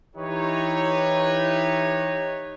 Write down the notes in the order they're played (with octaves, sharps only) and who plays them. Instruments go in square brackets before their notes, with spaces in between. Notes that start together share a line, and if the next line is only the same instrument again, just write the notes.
[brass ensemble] E3 D#4 E4 G4 B4 C#5